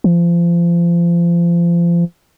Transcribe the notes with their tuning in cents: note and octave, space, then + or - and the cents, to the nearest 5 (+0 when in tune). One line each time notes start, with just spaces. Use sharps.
F3 -30